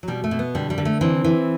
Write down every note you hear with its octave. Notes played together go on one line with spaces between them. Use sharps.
F#3
B2 G3
A3
B2
B3
D3 G3
G3
D3
A3
E3 C4
E3